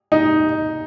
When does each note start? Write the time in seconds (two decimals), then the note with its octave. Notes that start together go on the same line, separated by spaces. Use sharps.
0.12 D#4